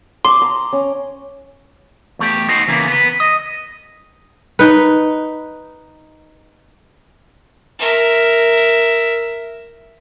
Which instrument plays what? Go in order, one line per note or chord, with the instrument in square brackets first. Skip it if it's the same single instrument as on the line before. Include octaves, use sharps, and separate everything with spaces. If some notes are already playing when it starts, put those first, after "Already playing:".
[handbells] C6 [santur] D6 D#6
[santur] A#5
C#4
[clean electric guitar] E2 A3 G4
D#4 F#4 C5
C#3 E3 A#3 B3
B3 B4
D#5
[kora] D#4 B4
[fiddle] A#4 E5